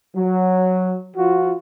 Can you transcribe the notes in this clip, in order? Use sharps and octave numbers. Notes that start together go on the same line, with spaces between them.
F#3
F3 F4 F#4